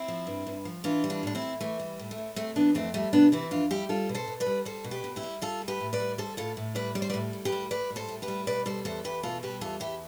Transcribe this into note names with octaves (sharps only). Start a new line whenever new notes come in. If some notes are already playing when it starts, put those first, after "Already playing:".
Already playing: C4 E4
F3
G2
G2
F3
E3 D4 F4
G3
D4 F4
A2 D4
C4 E4
A2
E3 A3
G3
A2
A3
A2
C3 A3 C4
E3 B3 D4
F2 A3 C4
G3 A3 C4
C3 B3 D4
E3 C4 E4
F2 D4 F4
G3 E4 G4
G3 F4 A4
B2
A4 C5
B2
B4 D5
G3
G3 A4 C5
B2
G4 B4
B2
E4 G4
G3
G3 F4 A4
A2
G4 B4
A2
B4 D5
G3
G3 A4 C5
A2 F4 A4
A2
G3 B4 D5
G3 D5
C5
B4 D5
A2
A2
G4 B4
G3
G3 B4 D5
A2
A4 C5
A2
G4 B4
G3
B2 B4 D5
G3 A4 C5
E2 A4 C5
E2 G4 B4
B2 F4 A4
G3 G4 B4
E2 F4 A4
E2 E4 G4